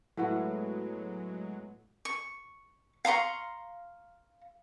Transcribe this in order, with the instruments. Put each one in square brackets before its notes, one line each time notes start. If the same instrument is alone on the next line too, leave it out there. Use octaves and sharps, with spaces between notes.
[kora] A2 B3 F#4 [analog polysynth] F#3 G#3
[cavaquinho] C#6
F5 A#5 C6 C#6